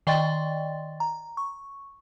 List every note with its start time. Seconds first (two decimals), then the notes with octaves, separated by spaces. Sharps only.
0.07 D#3 D5 D#5 G5 C6 A6
1.00 A#5
1.37 C#6